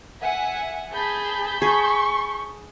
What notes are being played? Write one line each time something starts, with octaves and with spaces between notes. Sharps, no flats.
E5 F#5 G#5
G#4 A5 B5 G6
G#4 C#6